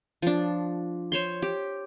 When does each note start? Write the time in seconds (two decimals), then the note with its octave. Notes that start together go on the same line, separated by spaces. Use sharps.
0.22 F3 D4
1.12 C5 C#5 C6
1.42 G4